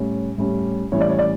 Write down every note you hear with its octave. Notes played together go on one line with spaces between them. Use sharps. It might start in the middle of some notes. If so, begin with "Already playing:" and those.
Already playing: A2 G3 C#4
A2 G3 C#4
A2 E3 G3 C#4 E4 C#5
D5
C#5
D5